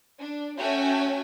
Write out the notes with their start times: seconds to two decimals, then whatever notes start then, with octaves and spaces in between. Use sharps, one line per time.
0.18 D4
0.57 A3 C#4 F#4 C#5 G5 G#5